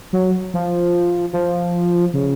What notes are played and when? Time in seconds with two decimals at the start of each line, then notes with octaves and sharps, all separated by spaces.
0.13 F#3
0.54 F3
1.33 F3
2.14 C#3